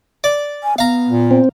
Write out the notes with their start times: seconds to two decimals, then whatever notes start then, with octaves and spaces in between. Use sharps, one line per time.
0.24 D5
0.63 G#5
0.78 B3 F5 A#5
1.09 A#2
1.31 C4